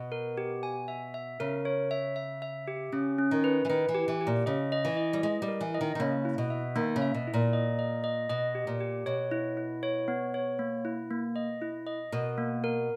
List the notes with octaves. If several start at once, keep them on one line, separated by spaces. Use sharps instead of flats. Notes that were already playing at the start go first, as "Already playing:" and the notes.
Already playing: B2
A#4
G4
G#5
E5
E5
C#3 A#4
C#5
E5
E5
E5
G4
C#3 C#4
C#4
D#3
B4
E3
D#3 B4
E3
G4
E3
G4
A#2
C#3 D#5
D#5
E3
D#5
G3
G#3 D#5
G3
A#4
E3
D#5
D#3
D#3
C#3 A#3
E4
B2
E5
D#3 A#3
C#3
E5
B2
E4
A#2
D#5
D#5
D#5
B2 D#5
G4
A#2
G4
B2 C#5
E4
E4
C#5
B3
C#5
A#3
E4
A#3
D#5
E4
D#5
B2 A#4
A#3
A#4